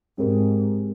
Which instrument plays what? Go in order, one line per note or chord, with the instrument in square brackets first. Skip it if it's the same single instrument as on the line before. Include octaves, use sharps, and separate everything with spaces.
[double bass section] G#2 [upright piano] G#3 C4 G4 A#4